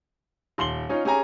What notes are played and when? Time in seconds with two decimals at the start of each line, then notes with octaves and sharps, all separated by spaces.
0.58 D#1 C6 F#7 G7
0.89 C#4 D#4 F4 C#5
1.05 C#4 G4 G#4 G#5 A#5